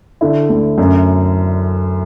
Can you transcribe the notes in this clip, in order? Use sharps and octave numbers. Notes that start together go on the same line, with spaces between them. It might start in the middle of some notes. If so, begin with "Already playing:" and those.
D3 E4
D2
F#2